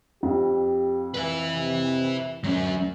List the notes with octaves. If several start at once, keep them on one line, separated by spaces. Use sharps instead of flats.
F2 G4
B4 E5
C3
D2 F#3 C#4